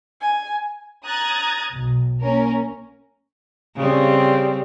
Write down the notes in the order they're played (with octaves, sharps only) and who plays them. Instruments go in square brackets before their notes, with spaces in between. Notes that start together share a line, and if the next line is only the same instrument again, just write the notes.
[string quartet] G#5
[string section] A#5 D#6 F#6 G#6 A6
B1
A#3 C#4 A#4
[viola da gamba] C#3 G3 C4